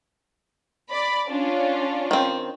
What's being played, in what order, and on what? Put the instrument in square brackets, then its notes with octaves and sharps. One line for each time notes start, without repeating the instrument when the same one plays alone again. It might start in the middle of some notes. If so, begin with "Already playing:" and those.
[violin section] D5 B5
C#4 D4 F4
[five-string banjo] D#3 C4